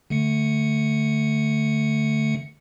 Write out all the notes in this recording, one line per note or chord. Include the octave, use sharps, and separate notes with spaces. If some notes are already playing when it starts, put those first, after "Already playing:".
D3 A3 C#7